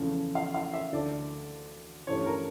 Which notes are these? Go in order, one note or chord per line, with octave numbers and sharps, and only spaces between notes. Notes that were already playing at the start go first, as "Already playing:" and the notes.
Already playing: E2 C#3 F3 A3 C#4
F5
F5
E5
D2 D3 A3 D4 D5
G2 E3 A3 C#4 C#5
A#4